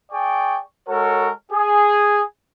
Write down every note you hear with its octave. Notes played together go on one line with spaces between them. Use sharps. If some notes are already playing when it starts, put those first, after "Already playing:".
G#4 D5 G5 C#6
G#3 F#4 A4 A#4 C#5
G#4